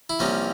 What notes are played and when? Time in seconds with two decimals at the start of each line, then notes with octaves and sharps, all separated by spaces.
0.10 E4
0.19 C2 C3 F3 A#3 C#4